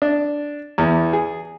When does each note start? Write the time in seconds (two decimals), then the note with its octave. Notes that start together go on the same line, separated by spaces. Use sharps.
0.02 D4
0.78 E2
1.13 G#4